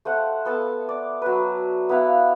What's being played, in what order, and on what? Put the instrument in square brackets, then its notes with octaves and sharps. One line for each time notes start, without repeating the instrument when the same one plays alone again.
[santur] A3 C5 F#5
B3 A4 A5
D5
F#3 B4
B3 E4 F5